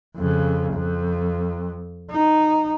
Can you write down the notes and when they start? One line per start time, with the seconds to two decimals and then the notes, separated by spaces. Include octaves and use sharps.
0.17 F2 C#3
0.73 F2
2.11 D#4